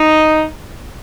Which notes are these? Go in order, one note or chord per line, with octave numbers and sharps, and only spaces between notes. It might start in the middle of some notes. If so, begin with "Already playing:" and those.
Already playing: D#4